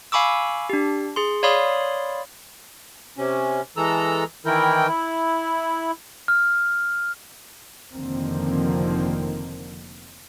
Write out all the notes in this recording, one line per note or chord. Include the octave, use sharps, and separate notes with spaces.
F5 G#5 B5 C#6 D6 E6
D4 G4
G#4 C6
C#5 D5 F5 B5 C6 D#6
C3 C#4
E3 G#3 A4 A#5 E6
D#3 E3 E4 A#4 G5
E4
F6
F1 D3 D#3 F3 A#3 C4